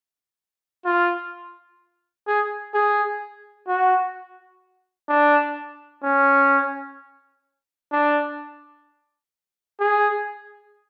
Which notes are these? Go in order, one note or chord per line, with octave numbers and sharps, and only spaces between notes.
F4
G#4
G#4
F#4
D4
C#4
D4
G#4